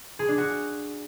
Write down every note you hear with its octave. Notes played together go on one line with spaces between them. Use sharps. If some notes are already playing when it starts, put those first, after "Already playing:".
G#4
D4
F#4